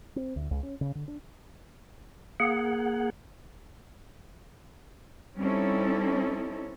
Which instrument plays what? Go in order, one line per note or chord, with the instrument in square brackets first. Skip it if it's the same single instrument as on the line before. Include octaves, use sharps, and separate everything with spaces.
[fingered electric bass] C4
D2
C#2
C#4
C#3
D3
D4
[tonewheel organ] A#3 G#4 F#5
[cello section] G3 C4 C#4 D#4 E4 A4